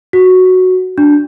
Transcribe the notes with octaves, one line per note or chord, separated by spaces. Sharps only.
F#4
D4